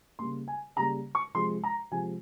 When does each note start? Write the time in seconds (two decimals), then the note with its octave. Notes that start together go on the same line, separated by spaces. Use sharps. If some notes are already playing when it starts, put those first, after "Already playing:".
0.19 C#3 G3 A#3 C6
0.48 G#5
0.76 C#3 G3 A#3 A#5
1.15 C#6
1.34 C3 F3 G#3 C6
1.64 A#5
1.92 C3 F3 G#3 G#5